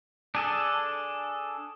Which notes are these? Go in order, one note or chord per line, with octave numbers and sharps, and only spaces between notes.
D4 G#4 A4